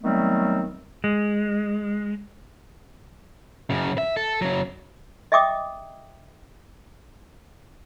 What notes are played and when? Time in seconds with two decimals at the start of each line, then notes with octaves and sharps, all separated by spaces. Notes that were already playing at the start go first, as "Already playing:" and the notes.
0.03 D#3 F#3 G3 A3 B3 C4
1.04 G#3
3.70 F#2 C#3
3.98 E5
4.17 A4
4.41 C#3 F#3
5.32 D#5 E5 G5 D6 D#6